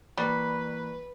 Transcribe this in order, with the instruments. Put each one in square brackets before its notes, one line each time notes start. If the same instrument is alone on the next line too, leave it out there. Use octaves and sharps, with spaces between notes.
[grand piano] E3 A#3 [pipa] G3 [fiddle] B4 [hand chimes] C#6 F#6 B6